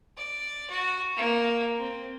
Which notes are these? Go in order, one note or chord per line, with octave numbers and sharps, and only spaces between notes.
D5
F#4
A#3
C4